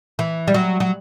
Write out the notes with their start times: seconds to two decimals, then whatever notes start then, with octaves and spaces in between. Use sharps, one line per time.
0.19 E3
0.48 G3
0.54 F#3
0.80 F#3